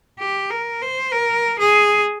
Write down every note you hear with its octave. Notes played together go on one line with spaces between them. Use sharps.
G4
A#4
C5
A#4
G#4